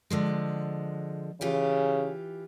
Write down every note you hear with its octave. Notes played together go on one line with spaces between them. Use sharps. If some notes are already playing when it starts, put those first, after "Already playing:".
D3 F3 G#3
C#3 E3 F4 G4